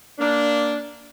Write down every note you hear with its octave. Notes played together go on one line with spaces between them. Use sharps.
A#3 D4